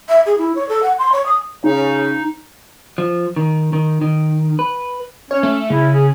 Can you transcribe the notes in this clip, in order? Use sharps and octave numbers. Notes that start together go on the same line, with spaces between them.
E5
G#4
E4
C#5
A4
F#5
C6
C#5
D#6
C#3 D#4
F3
D#3
D#3
D#3
B4
C#4 C#5
A3
C#3 E4
G#4